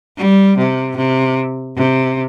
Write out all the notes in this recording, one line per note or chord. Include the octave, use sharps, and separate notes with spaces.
G3
C3
C3
C3